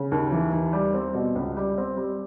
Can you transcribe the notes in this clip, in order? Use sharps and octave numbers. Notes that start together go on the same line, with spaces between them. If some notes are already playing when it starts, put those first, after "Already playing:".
Already playing: C#3
D#2
E3
D#2
G3
C4
B2
C#2
G3
C4
G3